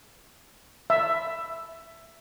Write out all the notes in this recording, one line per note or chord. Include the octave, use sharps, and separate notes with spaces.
E5